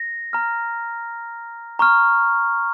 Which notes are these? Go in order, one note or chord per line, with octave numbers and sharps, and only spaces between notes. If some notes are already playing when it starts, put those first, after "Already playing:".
Already playing: A#6
A#5 F6
A#5 C#6 F6